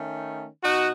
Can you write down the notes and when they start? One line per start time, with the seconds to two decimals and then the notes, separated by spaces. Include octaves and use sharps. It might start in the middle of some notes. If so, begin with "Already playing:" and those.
Already playing: D#3 A3 C#4
0.63 B2 D#4 F#4